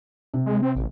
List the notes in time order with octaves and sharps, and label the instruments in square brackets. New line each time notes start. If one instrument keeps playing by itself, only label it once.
[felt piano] C3
[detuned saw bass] G#3
C4
A1